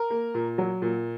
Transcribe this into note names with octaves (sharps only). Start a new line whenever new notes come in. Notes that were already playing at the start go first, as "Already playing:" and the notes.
Already playing: A#4
A#3
A#2
F#3
A#2